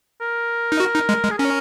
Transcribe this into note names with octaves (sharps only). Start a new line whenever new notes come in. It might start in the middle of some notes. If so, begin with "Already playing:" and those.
A#4
D#4
F#4
D#4
G#3
G#3
G#4
C#4 A#4